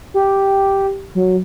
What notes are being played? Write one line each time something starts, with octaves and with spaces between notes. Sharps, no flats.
G4
F#3